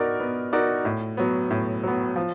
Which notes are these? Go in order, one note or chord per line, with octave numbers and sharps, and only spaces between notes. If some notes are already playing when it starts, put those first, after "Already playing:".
Already playing: B3 D#4 F#4 A#4 D5
B3
D#4 F#4 A#4 D5
A2
F#3 B3
A2
F#3 B3
F3